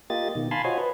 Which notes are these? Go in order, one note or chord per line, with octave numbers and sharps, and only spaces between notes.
A#3 F4 G4 D#5 A6
B2 D#3
F5 G#5 A5 B5 C6
F4 F#4 C5 C#5 D#5 G#5
B4